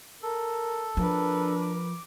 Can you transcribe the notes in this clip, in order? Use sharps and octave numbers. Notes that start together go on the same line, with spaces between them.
A4 A#4
F3 D4 A#4 B4
D6